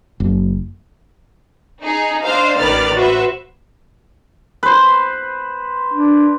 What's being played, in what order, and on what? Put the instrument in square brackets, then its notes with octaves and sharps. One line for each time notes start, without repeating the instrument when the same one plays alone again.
[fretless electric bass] F#1
[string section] D#4 G#4
D4 C5 D#5 F5
A1 D#3 B4 D5 F6 A6
F#4 B4 C5 E5
[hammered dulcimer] B4 C5
[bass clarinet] D4